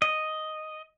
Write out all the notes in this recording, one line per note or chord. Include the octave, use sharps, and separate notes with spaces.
D#5